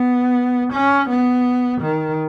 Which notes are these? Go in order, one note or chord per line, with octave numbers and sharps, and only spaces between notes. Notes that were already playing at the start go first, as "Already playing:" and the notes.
Already playing: B3
C#4
B3
D#3